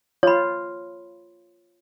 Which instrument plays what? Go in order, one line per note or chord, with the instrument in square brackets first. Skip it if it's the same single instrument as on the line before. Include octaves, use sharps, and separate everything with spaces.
[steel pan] F4 [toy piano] C#5 B5